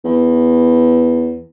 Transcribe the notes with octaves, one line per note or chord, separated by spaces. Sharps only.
E2